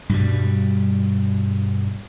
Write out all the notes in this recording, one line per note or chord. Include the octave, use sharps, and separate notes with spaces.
G2 B2 G3